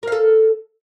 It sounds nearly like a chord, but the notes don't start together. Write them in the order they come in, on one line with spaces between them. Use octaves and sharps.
A#4 F5 A4